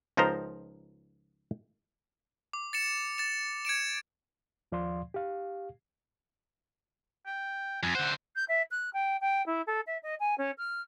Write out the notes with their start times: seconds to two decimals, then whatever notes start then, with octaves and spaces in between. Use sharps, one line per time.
0.17 C#2 F3 D#4 A#4 C5 A#5
2.53 D6
2.73 A6 C#7 E7
3.18 A6 E7
3.65 G#6 C#7 D7 E7
4.72 D#2 F3 D5 F5 C6
5.14 G4 F5
7.27 G5
7.83 F2 G#5
7.95 D3 C5 F#5
8.36 G6
8.48 E5
8.71 F#6
8.93 G5
9.21 G5
9.46 E4
9.67 A4
9.87 E5
10.03 D#5
10.20 G#5
10.38 C#4
10.58 F6